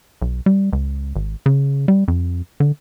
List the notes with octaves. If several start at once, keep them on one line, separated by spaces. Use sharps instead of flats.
B1
G3
C#2
G#1
C#3
G3
F2
D3